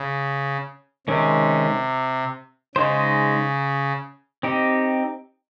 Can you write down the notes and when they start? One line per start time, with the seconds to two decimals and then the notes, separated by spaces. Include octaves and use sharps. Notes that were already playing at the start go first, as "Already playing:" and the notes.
Already playing: C#3
1.07 C3 D#3 G#3 C#4
2.75 C#3 G#3 D#4 G#4 C5
4.43 C4 D#4 G4